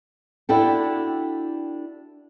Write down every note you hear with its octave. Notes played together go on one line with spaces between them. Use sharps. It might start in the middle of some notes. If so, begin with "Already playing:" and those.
D4 E4 F#4 G4 A4